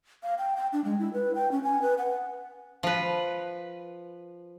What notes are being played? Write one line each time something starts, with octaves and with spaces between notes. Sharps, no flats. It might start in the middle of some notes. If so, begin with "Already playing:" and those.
F5
G5
G5
D4
G#3
E4
B4
G5
C#4
G#5
B4
F#5
F3 B4